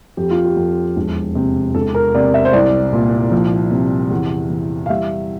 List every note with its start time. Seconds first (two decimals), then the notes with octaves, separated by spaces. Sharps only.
0.17 F2 G4
0.31 F4
0.45 G4
0.57 F2
0.96 E1
1.35 C3
1.75 E1 A4
1.95 A#4
2.14 C3 D5
2.34 E5
2.45 C5
2.53 C2 D5
2.93 A#2
3.32 F3
3.71 C3
4.11 E2
4.50 E3
4.86 F5
4.89 G3 E5